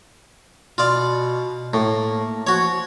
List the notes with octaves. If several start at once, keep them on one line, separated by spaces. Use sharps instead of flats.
B2 F4 D5
A2 A#3
F3 F#4 C#5